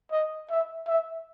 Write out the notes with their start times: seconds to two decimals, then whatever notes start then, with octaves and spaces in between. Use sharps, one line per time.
0.12 D#5
0.50 E5
0.88 E5